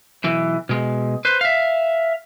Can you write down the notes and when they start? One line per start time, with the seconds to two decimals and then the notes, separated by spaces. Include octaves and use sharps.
0.24 B1 E3
0.69 B2 G#3
1.25 B4 C5
1.41 E5 F5